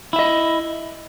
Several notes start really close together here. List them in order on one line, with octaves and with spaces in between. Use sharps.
E4 E5 D#5